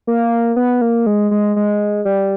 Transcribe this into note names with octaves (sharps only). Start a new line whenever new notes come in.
A#3
B3
A#3
G#3
G#3
G#3
G3